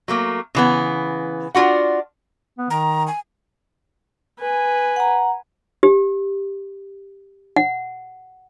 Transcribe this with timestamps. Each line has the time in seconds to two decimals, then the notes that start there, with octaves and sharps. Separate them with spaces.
0.08 F#3 A3 A#3
0.55 C#3 E3 B3
1.55 D4 F4 F#4 F#5
2.58 B3
2.70 D#3 A#5
3.07 G#5
4.39 B4 G#5
4.96 F#5 A#5
5.83 G4
7.56 F#5